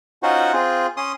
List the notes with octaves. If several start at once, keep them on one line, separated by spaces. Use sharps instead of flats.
C#4 D#4 F4 F#4 C5 F#5
C4 F4 G#4
C#4 C6 D#6